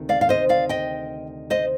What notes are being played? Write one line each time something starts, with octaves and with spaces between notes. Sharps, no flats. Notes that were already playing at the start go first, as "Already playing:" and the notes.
Already playing: D2 C3 D#3
D5 F5
F5
C5 D#5
D5 F5
D#5 G5
C5 D#5